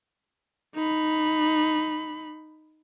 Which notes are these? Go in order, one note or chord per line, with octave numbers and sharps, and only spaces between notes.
D#4 B5